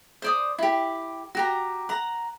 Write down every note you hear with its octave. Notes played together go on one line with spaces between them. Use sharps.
C5 D5 D#6
E4 G4
F#4 G4 A#5
F#5 A#5